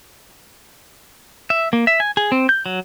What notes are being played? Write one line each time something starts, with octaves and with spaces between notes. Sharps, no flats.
E5
A#3
E5
G#5
G#4
C4
G6
F#3